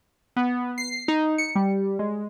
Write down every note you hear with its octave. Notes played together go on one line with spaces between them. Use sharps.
B3
C7
D#4
C#7
G3
G#3